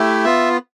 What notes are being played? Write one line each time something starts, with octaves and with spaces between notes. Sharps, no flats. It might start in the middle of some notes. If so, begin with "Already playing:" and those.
Already playing: A3 E4 G4
B3 F4 E5